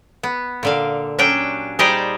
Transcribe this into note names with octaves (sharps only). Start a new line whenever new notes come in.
B3
A#2 D3 F5
F#3 C#4 D4 G4 G5
G3 D#4 G4 G#4 C5 D5